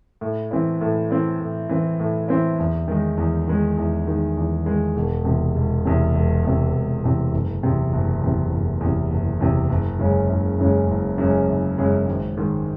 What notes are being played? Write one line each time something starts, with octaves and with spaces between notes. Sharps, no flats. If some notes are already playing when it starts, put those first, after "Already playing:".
A2
E3 C4 E4
A2
E3 C4 E4
A2
E3 C4 E4
A2
E3 C4 E4
E2
D#3 G#3 D#4
E2
D#3 G#3 D#4
E2
D#3 G#3 D#4
E2
D#3 G#3 D#4
E1
E2 C3
E1
E2 C3
E1
E2 C3
E1
E2 C3
F#1
E2 C3
F#1
E2 C3
F#1
E2 C3
F#1
E2 C3
F#1
F#2 C#3 G#3 C#4
F#1
F#2 C#3 G#3 C#4
F#1
F#2 C#3 G#3 C#4
F#1
F#2 C#3 G#3 C#4
G#1
G#2 D#3